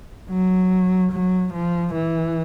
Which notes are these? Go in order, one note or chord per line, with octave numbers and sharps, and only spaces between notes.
F#3
F#3
F3
E3